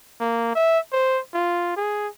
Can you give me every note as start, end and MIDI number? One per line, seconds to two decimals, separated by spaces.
0.20 0.54 58
0.55 0.79 76
0.93 1.19 72
1.34 1.73 65
1.77 2.08 68